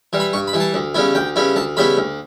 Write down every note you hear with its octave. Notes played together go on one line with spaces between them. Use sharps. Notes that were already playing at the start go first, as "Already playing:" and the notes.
E3 G3
B5
G2 C#6
B5
E3 G3
A5
D2
C#3 G3 B3 E4
D2 G5
C#3 G3 B3 E4
D2 A5
C#3 G3 B3 E4 B5
D2